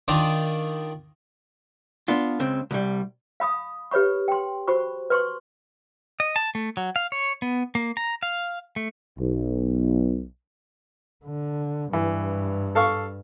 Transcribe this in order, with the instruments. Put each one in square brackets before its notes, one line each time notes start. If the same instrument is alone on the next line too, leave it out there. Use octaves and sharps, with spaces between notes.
[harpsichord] D#3 D4 F4 D#5
[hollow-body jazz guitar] B3 D4 F4
C#2 C#3 C4
C2 G3
[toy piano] F5 B5 D#6
G4 B4 C#5 B5 C#6
G5 C6
F#4 C5 B5 C#6
B4 C6 C#6
[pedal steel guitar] D#5
A5
A3
F#3
F5
C#5
B3
A#3
A#5
F5
A3
[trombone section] B1
[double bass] D3
[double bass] G2 [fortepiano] E3
[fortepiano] A4 F5 C#6